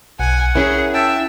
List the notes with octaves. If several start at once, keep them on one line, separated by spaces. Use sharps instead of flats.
B1 F#5 G#5
C#4 E4 G#4 A#4
E5 G5 A5